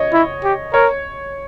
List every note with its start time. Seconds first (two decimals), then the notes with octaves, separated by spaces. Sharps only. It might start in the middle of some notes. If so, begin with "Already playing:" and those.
Already playing: C#5 D#5
0.13 E4
0.44 G4
0.73 A#4 C#5